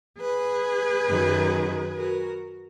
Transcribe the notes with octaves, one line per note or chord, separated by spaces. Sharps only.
G#4 B4
F#2 D#3 F#3
F#4 A#4